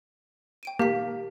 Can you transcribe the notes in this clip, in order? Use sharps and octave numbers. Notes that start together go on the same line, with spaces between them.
G5 D7 D#7
A#3 G4 F5 B6